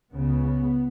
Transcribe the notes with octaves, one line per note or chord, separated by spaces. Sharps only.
C#2 C#3 B3